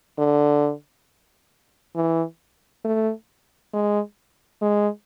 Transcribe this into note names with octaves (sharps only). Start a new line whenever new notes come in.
D3
E3
A3
G#3
G#3